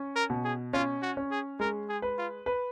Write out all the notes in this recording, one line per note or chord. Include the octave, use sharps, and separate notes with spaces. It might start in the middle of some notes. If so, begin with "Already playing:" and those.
Already playing: C#4
A#4
B2
G#4
C#4 F4
F#4
C#4
G#4
G#3 A#4
G#4
B4
F4
B4